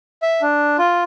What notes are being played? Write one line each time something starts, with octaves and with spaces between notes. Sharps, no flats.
E5
D4
F4